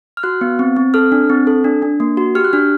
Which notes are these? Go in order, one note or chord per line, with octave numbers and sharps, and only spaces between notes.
F6
F#4 F#6
B3
C4
C4
A4 F6
D4
C4
A4
D4
D4
A#3
F#4
G4 F6
F#6
D4 F6